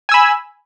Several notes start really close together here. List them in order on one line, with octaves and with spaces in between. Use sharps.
G#5 E6 B5